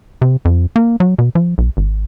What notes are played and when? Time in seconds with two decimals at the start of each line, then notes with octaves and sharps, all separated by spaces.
0.22 C3
0.45 F2
0.76 A#3
1.00 F#3
1.19 B2
1.35 F3
1.58 B1
1.77 G#1